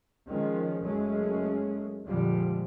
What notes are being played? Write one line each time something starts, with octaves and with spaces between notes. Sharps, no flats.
D#3 F3 G#3 C#4
F#1 F#3 G#3 A3 C#4
F2 A#2 D3 F3 G3 G#3